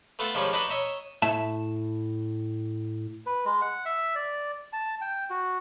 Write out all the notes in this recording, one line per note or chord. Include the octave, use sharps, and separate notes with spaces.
A3 B3 F4 A4
D#3 F3 G3 G#3 C#4
D4 D#4 B4 D#5 B5 C#6
C#5 D#5 E5 A#5 C#6
A2 E5 A5
B4
G#3
F#5
E5
D5
A5
G5
F#4